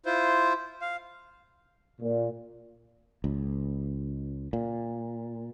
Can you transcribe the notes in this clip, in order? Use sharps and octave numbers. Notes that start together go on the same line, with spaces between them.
E4 F4 C5
F5
A#2
C#2
A#2